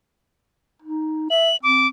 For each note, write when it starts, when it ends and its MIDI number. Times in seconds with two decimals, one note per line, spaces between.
0.82 1.27 63
1.30 1.51 76
1.30 1.56 102
1.63 1.88 60
1.63 1.87 86